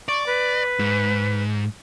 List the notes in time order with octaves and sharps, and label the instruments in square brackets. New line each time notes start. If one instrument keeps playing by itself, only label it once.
[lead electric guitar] D5 [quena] C#6
[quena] B4
[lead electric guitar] G#2